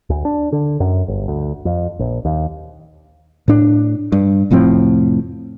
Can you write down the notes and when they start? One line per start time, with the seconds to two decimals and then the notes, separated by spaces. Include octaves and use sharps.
0.10 D2
0.25 D4
0.52 D3
0.80 F#2
1.08 G1
1.28 D2
1.65 F2
1.99 A#1
2.25 D#2
3.48 A2 D4
4.12 G2
4.50 F1 A2 F3 C4